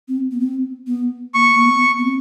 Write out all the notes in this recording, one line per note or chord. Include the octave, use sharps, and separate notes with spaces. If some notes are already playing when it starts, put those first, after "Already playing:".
C4
B3
C4
B3
A#3 C#6
A#3
B3
B3
C4